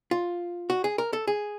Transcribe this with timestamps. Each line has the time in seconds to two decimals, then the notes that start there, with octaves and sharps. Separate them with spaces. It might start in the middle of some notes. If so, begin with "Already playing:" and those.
0.11 F4
0.70 F#4
0.84 G#4
0.98 A#4
1.13 A4
1.28 G#4